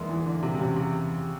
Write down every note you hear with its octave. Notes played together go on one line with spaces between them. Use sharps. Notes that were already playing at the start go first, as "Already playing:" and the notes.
Already playing: E2 G#3 A#3 D#4
E3
D3
C3
C3
C#3
C3